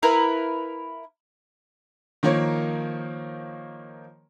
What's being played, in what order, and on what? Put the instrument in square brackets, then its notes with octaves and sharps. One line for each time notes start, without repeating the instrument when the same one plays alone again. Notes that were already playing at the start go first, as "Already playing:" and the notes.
[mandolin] E4 A#4 B4 F5
[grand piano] D#3 F3 A#3 C#5